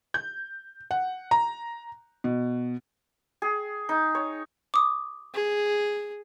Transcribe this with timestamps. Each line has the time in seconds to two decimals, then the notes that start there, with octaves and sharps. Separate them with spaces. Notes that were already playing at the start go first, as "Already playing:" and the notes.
0.14 G6
0.91 F#5
1.31 A#5
2.24 B2
3.42 G#4
3.89 D#4
4.15 C#5
4.74 D6 D#6
5.34 G#4